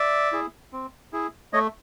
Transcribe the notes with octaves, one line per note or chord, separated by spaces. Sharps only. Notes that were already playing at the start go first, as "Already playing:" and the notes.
Already playing: D5 E5
E4 G#4
C4
E4 G#4
A3 C#5 D#5